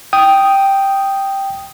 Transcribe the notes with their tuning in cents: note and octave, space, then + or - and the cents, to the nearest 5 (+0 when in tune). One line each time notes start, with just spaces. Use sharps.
G5 +0 D#6 +0